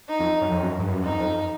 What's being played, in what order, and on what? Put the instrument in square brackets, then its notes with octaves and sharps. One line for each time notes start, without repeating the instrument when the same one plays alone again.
[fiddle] D#4
[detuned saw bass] F2
F#2
F2
F#2
G2
F#2
[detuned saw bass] F2 [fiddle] D#4
[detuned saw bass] F2